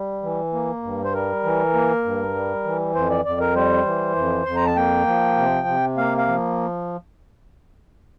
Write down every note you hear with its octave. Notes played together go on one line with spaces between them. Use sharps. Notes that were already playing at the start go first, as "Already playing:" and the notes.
Already playing: G3
E3
A#3
G2
C5
G3 A#4
E3
A#3
G2
G3
E3
F2 C5
D5
F2 D5
A#4
G3 C5
E3
F2
F2 C6
A#5
A5
A#3 G5
F3
C3
C3
A#3 F5
F5
F3